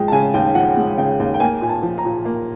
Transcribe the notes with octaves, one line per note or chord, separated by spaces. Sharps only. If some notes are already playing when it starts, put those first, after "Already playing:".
Already playing: F3 G#3 G5
A5
C#3 G#5
D#2 G5
F3 F#5
G#3
C#3 G5
D#2
G5
A#3 G#5
A#2 G#5
A5
F3
A#5
A#2
A#3